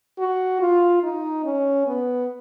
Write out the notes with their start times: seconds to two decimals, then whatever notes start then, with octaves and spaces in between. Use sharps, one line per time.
0.18 F#4
0.60 F4
1.03 D#4
1.44 C#4
1.87 B3